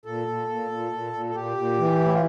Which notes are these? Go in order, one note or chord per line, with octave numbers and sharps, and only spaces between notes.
A#2 A4
A#2
A#2
A#2
A#2
A#2
A4
A#2 G4
A#2
E3
A2
E4
F4